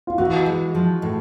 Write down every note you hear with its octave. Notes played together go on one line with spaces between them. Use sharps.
F4
E3 F#4
G#3
F3
A2